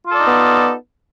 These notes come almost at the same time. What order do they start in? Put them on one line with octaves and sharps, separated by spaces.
F4 A4 D5 D#4 B3